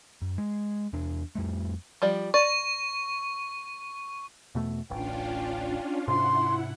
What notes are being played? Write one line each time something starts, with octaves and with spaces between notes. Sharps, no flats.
F#2
G#3
E2 D4
F2 G3 A3
F3 G3 D5
D5 C#6
E2 B2 A3
D1 A1 C#4 D4 F4 G5
G#2 C3 E4 F#5 C6